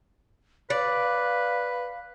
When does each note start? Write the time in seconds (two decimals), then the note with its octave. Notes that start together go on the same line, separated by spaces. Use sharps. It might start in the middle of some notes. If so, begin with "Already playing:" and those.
0.70 B4 D5 F5